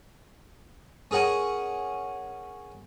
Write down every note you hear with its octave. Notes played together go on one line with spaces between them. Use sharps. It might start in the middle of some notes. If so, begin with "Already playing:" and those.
C#4 G#4 A#4 F#5 G#5